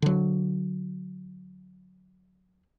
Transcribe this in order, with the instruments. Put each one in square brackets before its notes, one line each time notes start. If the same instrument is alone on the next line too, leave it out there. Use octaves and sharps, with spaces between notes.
[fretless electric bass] D3 F#3